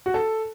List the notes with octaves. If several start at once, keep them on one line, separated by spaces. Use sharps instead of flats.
F#4
A4